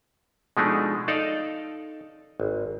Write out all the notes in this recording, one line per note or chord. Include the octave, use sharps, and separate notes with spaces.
B2 F3 G#3 A3 D4 D#4
D#4 A4 D5 D#5 F5
G#1